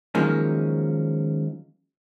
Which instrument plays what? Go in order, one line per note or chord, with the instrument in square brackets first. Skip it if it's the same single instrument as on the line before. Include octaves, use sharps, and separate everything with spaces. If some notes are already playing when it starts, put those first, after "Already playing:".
[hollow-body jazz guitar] D#3 F3 F#3 G#3 A#3 C#4